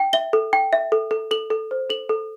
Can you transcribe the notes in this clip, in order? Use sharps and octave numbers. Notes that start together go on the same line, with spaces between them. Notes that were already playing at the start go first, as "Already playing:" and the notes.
Already playing: G5
E5 G7
A4
G5
E5
A4
A4
A4 F#7
A4
C5
A4 F#7
A4